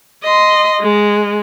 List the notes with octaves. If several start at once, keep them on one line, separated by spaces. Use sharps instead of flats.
D#5 C6
G#3